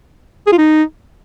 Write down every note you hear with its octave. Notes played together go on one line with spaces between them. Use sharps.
G#4
F4
D#4